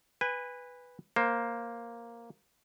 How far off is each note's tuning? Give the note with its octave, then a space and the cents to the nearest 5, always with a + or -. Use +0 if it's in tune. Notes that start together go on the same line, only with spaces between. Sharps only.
B4 +0 G#5 -30
A#3 +0 C5 +10